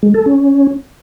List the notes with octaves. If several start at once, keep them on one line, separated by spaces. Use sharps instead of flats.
G#3
A4
C#4